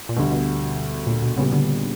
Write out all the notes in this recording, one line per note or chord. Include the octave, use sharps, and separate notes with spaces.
A#2
D2 B2 D3 G3
B2
A#2
B2
A#2 C#3 G3 B3
D3